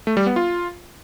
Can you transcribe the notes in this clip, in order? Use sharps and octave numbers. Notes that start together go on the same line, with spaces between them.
A3
G3
B3
F4